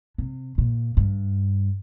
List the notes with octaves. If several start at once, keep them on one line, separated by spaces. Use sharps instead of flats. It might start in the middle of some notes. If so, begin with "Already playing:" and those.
C3
A#2
G2